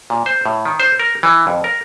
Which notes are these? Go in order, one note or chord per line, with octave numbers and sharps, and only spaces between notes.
A#2
C5
A2
D#3
C5
A#4
E3
F2
A#4